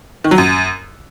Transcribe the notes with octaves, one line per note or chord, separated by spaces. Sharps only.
D#3
F#3
F#2